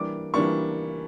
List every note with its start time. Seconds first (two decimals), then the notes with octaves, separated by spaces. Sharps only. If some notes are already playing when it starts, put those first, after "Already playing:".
Already playing: E3 G3 A#3 D4 D6
0.34 E3 G3 A#3 D4 C#6